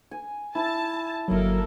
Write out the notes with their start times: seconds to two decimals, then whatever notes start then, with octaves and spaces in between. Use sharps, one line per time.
0.11 G#5
0.55 E4 A5
1.28 G1 F#3 A#3 E4 A4 A#4 D#5 E5